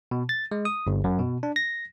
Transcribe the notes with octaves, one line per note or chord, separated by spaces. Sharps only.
B2
A6
G#3
D#6
G1
F#2
B2
D4
A#6